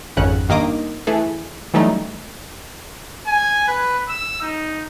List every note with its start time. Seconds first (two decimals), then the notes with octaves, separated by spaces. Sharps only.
0.17 G#1 F2 C#3 C#4 F#5 F#6
0.49 G2 D#3 A#3 D#5 D6 D#6
1.07 E3 A3 G#4 A4
1.74 E3 F#3 G3 A3 C#4 D#4
3.27 G#5
3.68 B4
4.09 E6
4.41 D#4